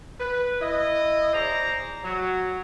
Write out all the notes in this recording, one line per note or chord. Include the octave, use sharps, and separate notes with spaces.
B4
E4 D#5
G#4 C5 D5 A#5
F#3